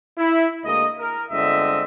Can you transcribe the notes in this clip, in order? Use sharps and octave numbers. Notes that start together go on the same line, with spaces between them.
E4
D2 G#3 A#3 D#5
A#4
G1 D3 G#3 C4 D#5 E5